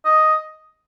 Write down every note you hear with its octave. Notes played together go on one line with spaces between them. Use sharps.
D#5